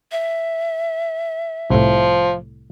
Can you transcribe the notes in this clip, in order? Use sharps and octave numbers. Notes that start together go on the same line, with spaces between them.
E5
C2 A2 F3